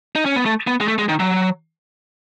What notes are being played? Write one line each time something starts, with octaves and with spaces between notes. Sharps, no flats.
D#4
C#4
B3
A3
B3
G#3
A3
G#3
D#3
F#3